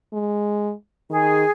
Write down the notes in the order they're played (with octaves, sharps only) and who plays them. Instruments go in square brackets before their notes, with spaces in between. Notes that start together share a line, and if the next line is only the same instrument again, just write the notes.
[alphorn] G#3
[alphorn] D#3 [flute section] G#4